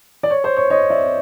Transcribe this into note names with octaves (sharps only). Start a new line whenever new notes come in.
D5
C#5
C5
C#5
C#5 D#5
D5 E5